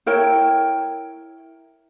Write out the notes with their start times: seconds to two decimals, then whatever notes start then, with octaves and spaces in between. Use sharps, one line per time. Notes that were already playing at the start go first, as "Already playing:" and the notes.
0.06 E4 A#4 C#5 G5